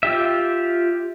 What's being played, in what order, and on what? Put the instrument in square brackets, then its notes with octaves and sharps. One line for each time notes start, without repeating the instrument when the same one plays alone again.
[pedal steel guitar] F4 G4 E5